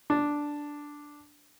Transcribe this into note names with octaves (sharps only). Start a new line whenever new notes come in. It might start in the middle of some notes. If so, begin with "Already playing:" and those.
D4